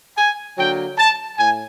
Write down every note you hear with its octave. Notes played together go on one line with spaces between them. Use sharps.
G#5
D3 F#3 A#3 G5
A5
A2 G#5